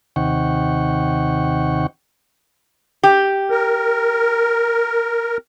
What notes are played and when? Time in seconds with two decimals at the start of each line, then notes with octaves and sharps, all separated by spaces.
0.16 D#2 C3 D#3 F#5 G5 C#6
3.03 G4
3.50 A#4